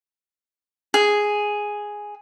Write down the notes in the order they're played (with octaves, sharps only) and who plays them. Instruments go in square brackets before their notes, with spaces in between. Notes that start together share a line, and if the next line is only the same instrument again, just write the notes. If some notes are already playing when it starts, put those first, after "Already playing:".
[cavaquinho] G#4